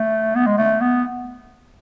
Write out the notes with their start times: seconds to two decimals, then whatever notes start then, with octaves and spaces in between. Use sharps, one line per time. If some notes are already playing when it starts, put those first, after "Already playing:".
Already playing: A3
0.36 B3
0.47 G#3
0.58 A3
0.81 B3